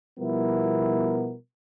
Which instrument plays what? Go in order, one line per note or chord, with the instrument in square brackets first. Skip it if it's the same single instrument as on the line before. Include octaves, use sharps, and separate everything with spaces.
[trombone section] B2 F3 G3 B3 E4 A#4